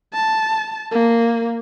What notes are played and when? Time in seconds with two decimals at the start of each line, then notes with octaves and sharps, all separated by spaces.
0.14 A5
0.92 A#3